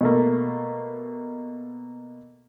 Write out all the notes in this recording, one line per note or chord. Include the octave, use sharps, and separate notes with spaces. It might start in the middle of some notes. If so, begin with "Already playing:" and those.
B2 A3 A#3